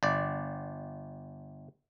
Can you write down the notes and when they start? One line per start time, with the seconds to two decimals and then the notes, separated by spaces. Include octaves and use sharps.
0.03 G1 D5